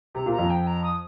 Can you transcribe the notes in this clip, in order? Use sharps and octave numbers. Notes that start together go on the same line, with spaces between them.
C3 A#5
A#2
A#5
F2
G5
A#5
D#6